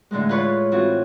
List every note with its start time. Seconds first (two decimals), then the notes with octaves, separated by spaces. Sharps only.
0.11 A2 D3 E3 G#3
0.29 F4 B4 C#5
0.72 E3 C4 F4 F#4